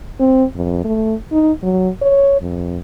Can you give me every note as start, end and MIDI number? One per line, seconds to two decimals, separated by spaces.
0.20 0.44 60
0.55 0.80 41
0.85 1.14 57
1.32 1.51 63
1.62 1.90 54
2.02 2.38 73
2.42 2.79 41